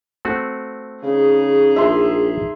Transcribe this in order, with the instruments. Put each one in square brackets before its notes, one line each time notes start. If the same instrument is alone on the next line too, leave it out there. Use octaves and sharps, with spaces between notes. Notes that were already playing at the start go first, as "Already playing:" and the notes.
[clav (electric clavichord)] A3 C4 F#4
[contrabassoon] C#3 [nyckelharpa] D#4 G#4
[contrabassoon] A#1 [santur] E5 C6